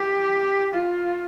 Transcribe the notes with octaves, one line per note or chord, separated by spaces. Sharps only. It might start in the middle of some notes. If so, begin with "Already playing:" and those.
Already playing: G4
F4